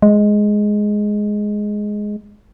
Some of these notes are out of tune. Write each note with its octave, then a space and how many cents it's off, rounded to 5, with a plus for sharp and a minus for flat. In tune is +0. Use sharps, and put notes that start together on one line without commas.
G#3 +5